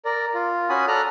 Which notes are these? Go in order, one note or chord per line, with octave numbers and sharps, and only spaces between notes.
A#4 D5
F4
C#4 F#4 G#5 B5 D#6
A4 D5 A#5 F6 F#6